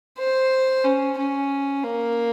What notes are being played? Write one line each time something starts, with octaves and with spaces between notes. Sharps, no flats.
C5
C#4
C#4
A#3